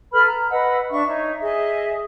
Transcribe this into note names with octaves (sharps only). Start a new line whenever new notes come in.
A4 B4 B5 F6
A#5
B4 D#5 F#5 E6
D4 E5 C#6
D#4 C#5 E5
G#4 D#5 E5